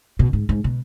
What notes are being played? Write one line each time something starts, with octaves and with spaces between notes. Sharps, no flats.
B2
G#2
G#2
B2